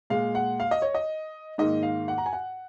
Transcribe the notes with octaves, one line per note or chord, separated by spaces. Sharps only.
A#2 G#3 F5
F#5
F5
D#5
C#5
D#5
G#2 D#3 A#3 D#5
F5
F#5
A#5
G#5
F#5